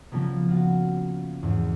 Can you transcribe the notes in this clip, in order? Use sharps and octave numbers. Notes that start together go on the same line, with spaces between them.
C#3 F3 G3 A#3 B3
F4 F#4
E2 G#2